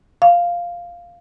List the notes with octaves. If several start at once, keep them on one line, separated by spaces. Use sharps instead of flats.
F5